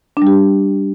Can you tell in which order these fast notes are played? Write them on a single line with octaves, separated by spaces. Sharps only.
D4 G3 G4